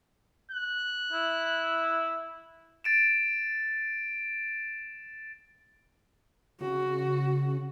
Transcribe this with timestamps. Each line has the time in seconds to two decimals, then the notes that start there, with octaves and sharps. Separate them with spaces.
0.51 F#6
1.13 E4
2.84 A6 D7 E7
6.61 C#3 F#4